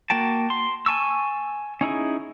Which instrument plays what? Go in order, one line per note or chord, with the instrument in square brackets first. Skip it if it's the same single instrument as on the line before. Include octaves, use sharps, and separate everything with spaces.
[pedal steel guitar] A#3 F#4 G5 A5
C6
G#5 A5 C#6 E6
C#4 D#4 E4 G#4